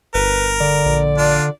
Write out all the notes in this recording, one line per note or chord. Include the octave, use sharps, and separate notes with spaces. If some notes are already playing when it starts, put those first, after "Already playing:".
G1 A#4 B4
D3 D5
A#1
D4 F4